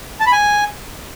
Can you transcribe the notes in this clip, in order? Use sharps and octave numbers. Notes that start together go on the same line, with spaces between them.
A5
B5
G#5